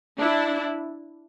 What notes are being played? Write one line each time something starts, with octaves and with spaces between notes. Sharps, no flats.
D4 E4